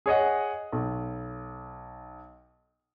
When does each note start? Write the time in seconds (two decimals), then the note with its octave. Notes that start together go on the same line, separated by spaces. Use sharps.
0.06 G#4 C#5 D#5 F#5
0.73 B1